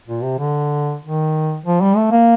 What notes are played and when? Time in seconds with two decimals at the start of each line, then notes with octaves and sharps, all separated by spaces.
0.08 A#2
0.23 C3
0.39 D3
1.02 D#3
1.65 F3
1.81 G3
1.96 A3
2.11 A#3